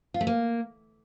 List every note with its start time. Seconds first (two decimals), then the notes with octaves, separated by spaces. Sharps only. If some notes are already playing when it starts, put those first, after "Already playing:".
0.14 F4
0.21 A3
0.27 A#3